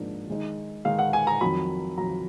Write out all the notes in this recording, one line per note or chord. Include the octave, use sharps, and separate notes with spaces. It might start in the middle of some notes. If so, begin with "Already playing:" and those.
Already playing: G#2 F3 A#3 D4
D#3 G#3 D#4
D#3 G#3 D#4 F5
F#5
G#5
A#5
F2 D#3 F#3 B5
F2 D#3 F#3 A#5